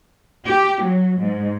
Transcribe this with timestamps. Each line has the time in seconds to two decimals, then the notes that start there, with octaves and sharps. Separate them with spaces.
0.46 G4
0.82 F#3
1.18 G#2